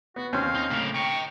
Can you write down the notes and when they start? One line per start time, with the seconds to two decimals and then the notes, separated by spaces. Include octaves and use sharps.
0.16 B3 F#4
0.33 D#2 C4 C#4 F5
0.55 D#4
0.71 A2 C#3 A#4
0.94 G5 A#5 C#6